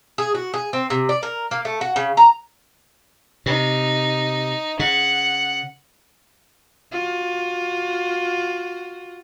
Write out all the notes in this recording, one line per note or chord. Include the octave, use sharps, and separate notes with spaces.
G#4
F#4
G#4
C4
C3
D5
A#4
A#3
A3
F#4
C#3
A#5
C3 D#4
C#3 F#5
F4 F#4